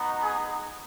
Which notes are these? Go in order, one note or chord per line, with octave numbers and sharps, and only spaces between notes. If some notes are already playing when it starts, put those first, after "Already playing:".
Already playing: B3 D#4 F#4
G#4